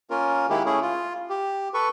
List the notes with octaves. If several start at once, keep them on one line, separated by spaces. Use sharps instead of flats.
A#3 C#4 F4 A#4
D#3 G#3 A#3 E4 G4
A3 C#4 E4 G#4
F4
G4
A4 B4 C#6